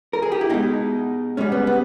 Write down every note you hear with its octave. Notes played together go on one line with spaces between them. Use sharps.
A#4
G#4
G4
E4
B2 G#3 D#4
G#2 G3 C#4
B3
B3